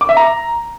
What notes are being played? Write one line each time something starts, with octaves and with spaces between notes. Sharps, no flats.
D6
E5
A#5